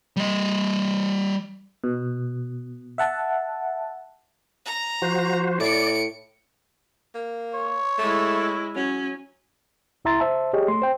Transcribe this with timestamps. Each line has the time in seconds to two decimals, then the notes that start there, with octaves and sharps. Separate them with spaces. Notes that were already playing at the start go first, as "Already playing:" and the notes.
0.17 G3 D#5
1.84 B2
2.98 E5 F#5 A5
4.65 A#5
5.02 F3 F#4 C5
5.60 A2 D5 C#7 D7
7.15 A#3
7.55 C#5
7.99 G#3 A3 E4
8.76 F#3 C#4
10.05 C2 E4 E5 A#5 C6 A6
10.20 C5 E5 A5
10.53 G4 G#4 C#5 D#5
10.68 A3 C6
10.82 C5 G5